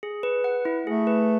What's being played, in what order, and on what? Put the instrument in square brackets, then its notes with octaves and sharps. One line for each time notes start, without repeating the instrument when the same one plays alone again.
[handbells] G#4
B4
F#5
E4
[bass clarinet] A3 [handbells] G#4
[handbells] B4